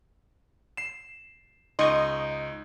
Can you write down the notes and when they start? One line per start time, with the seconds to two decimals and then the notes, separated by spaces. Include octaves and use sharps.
0.77 C7 E7
1.79 C#2 D#4 D#5 C6 C#6